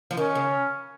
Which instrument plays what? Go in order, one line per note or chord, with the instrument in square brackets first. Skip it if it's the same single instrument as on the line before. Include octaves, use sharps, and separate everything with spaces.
[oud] F3
[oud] D#3 [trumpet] C#4
[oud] C#3